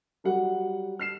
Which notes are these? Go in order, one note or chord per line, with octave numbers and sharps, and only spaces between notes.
F#3 G3 F#5
F6 C7 E7